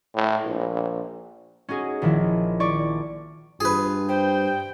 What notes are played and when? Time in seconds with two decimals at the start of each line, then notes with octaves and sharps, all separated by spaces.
0.14 A2
0.45 A#1
1.68 C#4 D#4 F#4 G#4
2.02 A#1 D#3 F3 E4
2.60 E4 D5 C#6
3.61 G2 F4 G#4 B4
4.09 C5 G5